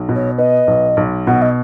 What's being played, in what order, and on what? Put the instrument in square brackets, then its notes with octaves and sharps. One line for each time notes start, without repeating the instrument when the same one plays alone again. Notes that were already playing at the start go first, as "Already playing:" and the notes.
Already playing: [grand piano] B1
B2
[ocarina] C#5
[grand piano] B3 [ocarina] D#5
[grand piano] B1
B1
[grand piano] B2 [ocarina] F#5
[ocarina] D#5